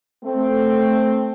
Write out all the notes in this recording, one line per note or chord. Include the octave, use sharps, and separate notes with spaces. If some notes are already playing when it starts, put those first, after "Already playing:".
A3 C4